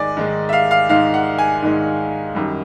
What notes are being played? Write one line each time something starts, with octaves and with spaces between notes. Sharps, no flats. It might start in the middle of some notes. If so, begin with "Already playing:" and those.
Already playing: G#2 D#3 G#3 D5 G#5
G#2 D#3 G#3
E5
F5
F5
G#2 D#3 G#3 F5
F#5
G#5
G#2 D#3 G#3
F#2 D#3 G3